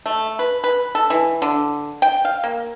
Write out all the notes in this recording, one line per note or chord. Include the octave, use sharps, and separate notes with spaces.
A3
B4
B4
A4
E3
D3
G5
F5
A#3